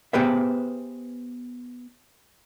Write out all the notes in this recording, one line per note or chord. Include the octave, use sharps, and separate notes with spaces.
B3 G4 G#4 B4 C5 E5